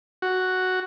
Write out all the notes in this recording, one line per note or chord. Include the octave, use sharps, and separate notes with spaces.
F#4